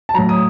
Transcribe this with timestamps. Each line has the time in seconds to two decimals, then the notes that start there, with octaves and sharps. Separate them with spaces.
0.09 A5
0.14 A2 F#3 A#5
0.29 D#6